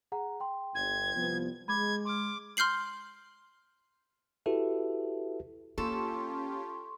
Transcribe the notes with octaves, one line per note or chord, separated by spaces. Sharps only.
G#4 F#5 A#5
G5 C6
G1 G#6
C2 F3 B3
G#3 B5 D6 G#6
C6 D6 F6
C6 F6 G6 C7 F#7
E4 F#4 G4 A4 B4 E5
A#3 C#4 F4 G4 A4 C6 C#6